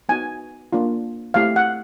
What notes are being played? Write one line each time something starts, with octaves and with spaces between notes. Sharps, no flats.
B3 D#4 F#4 G#5
A#3 D4 F4
A3 C4 E4 G4 F5
F#5